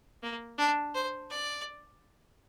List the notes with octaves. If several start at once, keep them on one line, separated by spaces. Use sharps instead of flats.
A#3
D4
C5
D5